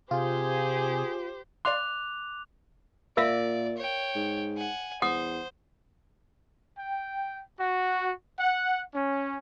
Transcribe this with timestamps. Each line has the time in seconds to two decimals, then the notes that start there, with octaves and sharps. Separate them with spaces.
0.11 C3 F4 G4 G#4 C5
1.65 D5 F5 C6 D6 F#6 F7
3.17 A#2 A#4 D5 E5 F5
3.77 C#5 G5
4.15 G#2
4.57 F#5 G#5
5.02 E2 C5 F#5 D#6
6.76 G5
7.58 F#4
8.38 F#5
8.93 C#4